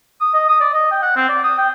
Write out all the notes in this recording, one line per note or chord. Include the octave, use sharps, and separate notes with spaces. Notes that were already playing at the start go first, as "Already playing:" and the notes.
D#6
D#5
D#6
D5
D#5
G5
F#5
C4
D5
D#6
G5